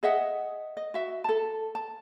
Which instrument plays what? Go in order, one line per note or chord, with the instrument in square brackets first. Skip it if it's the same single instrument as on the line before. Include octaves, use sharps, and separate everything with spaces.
[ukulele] G#4 D#5 E5 F#5
D#5
F#4 E5
A4 A5
A5